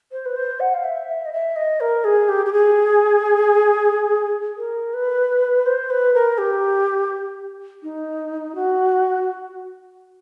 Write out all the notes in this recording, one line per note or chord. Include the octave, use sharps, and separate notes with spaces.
C5
B4
C5
F#5
F5
E5
E5
D#5
E5
D#5
A#4
G#4
G4
G4
G#4
A#4
B4
C5
B4
A#4
G4
D#4
F#4